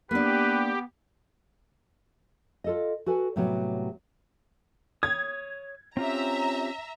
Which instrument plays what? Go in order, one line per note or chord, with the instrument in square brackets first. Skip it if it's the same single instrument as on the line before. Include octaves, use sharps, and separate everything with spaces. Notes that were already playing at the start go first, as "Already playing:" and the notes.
[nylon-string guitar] A#3 D4 [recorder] B3 [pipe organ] G4 [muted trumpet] B4
[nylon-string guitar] F4 A4 D#5
F#4 A4 B4 G#5
A2 C3 F#3 G3 B3 C#5
[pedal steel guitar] C#5 D#6 [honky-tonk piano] G#6
[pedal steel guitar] C4 F4 G4 [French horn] C#4 [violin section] E5 A#5